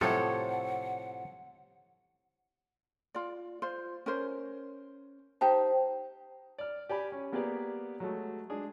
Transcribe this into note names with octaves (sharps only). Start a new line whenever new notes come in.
A2 C3 F3 A4 C5 C#5 F#5
F4 D5
F4 C5
C#4 A#4 C5
D#4 G4 C5 A5
D5 F6
G4 D5 G#5 B5
C#4
A#3 B3 G4 G#4 B4 D5
F#3 G#3 A3
G#3 D4 G#4